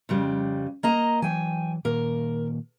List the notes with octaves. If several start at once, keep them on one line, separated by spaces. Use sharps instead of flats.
F2 C#3 G3
A#3 D#5 A#5
E3 F#3 G5 G#5
A#2 D#3 A#3 A#4